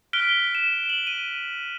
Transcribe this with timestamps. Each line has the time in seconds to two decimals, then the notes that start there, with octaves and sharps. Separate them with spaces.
0.13 F6 F#6 B6 D7 G7
0.55 E7
0.86 E7 F#7
1.07 D#7